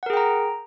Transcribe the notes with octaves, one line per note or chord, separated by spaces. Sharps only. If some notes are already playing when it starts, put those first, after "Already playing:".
G#4 A#4 F#5 G5 A#5